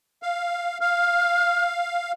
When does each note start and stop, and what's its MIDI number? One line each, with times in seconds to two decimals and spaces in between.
0.22 0.78 77
0.81 2.12 77
0.81 1.66 89